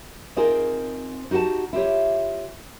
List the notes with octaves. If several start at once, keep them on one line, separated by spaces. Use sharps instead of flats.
C4 D#4 F4 G#4 A#4 C5
D#4 F#4 G4 F#5 A5
E4 F4 G4 C#5